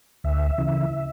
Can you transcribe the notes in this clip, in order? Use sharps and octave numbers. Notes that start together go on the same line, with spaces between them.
D2 E5
C#3 E3